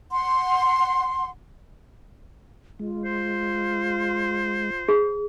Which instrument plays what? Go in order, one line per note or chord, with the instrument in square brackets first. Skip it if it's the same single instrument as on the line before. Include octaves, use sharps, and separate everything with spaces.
[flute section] F#5 C6
[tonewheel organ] G#3 [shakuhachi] F4
[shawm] C5
[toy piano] G#4